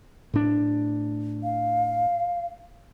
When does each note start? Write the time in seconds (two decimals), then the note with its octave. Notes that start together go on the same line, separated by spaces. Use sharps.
0.34 A2 D4
1.44 F5